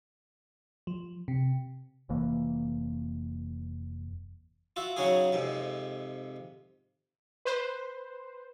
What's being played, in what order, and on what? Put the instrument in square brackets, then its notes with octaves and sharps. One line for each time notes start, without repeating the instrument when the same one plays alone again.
[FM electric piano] F3
C3
[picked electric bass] F1 F2 E3 A#3
[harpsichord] F4 F#4 E5
C#3 F#3 C#4 D#4 F#4 G#4
F2 G#2 C3
[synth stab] B4 C5